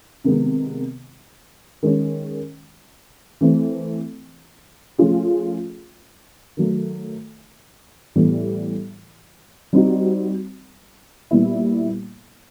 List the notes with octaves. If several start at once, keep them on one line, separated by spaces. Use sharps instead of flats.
C3 D#3 G#3 B3
D#3 G#3 C#4
E3 A3 C4
F3 A3 C#4 F4 G#4
D#3 F#3 A3
A2 E3 G3 B3
G3 C4 D#4 F#4
A#2 G3 B3 E4